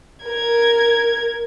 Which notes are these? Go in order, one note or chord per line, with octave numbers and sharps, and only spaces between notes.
A#4 G#6